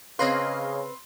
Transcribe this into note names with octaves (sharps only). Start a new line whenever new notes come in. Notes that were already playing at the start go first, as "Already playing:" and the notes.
C#3 C4 B4 C#5 D#5 F5 C6